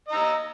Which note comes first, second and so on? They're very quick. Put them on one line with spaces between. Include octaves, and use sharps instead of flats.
D#5 A#5 E6